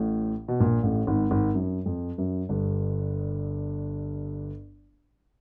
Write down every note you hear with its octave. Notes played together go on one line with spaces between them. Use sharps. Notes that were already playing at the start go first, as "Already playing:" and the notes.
Already playing: A1 A2
B2
A#1 A#2
A1 A2
G#1 G#2
G#1 G#2
F#2
F2
F#2
G1 G2